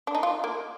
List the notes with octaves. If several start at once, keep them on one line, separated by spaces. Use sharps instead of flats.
D4
D#4
F4
A#3